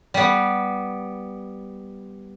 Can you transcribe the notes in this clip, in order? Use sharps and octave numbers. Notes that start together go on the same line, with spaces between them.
G3 B3